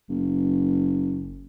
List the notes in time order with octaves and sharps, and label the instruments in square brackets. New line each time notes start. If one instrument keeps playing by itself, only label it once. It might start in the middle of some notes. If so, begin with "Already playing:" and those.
[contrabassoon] F#1